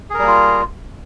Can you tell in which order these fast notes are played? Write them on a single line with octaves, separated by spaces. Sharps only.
G#4 A#4 G3 A#3 F4